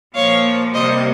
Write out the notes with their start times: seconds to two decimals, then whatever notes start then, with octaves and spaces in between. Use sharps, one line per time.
0.15 A#2 F3 A#3 C#5 F5
0.73 C3 G3 A#3 C5 D#5